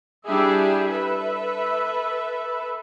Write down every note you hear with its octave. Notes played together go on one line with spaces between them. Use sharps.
G3 D4 E4 G4 G#4 E5
A4 B4 E5